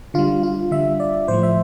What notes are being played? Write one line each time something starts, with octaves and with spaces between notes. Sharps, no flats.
D3 G3 F4
F4
D3 G3 E5
D5
A2 F3 A3 C5
E5